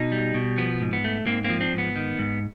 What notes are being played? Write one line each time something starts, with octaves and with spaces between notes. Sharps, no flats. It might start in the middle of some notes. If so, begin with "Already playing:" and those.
Already playing: B2 D#4
G3
B2
F3 B3
G#2
B3
A3
G#2 A#3 C4
A#3 C4
F3
C4 D4
G#2
B3
D#3
G#2